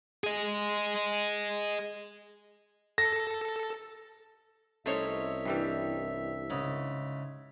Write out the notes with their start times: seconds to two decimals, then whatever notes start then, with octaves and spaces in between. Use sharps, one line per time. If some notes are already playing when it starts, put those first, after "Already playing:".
0.24 G#4 D#5
2.98 A4 A#6
4.86 C2 A3 C4 C#4 D#4 C5 C#5 E5
5.45 G2 E3 G3
6.50 G#2 C#3